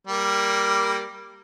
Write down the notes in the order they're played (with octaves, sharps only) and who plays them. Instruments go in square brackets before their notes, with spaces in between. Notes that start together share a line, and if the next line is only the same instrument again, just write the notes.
[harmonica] G3 A#3